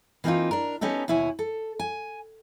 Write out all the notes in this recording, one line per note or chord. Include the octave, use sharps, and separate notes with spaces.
E3 A#3 C4 C#4 D#4 F4
D4 A#4
B3 C#4 D#4 G4 A4
D#2 B2 E4 C#5 G#5
A4
G#5